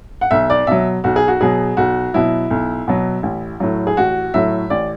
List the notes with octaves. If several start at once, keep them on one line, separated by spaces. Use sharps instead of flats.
F#5
B1 E5
D5
B2 F#3 E5
B1 F#4
G#4
F#4
B2 F#3 G#4
B1 F#4
B2 F#3 E4
B1
B2 F#3
A1
A2 F#3
G#4
A1 F#4
A2 F#3 E5
A1 D5